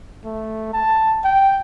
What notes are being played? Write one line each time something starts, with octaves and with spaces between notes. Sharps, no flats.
A3
A5
G5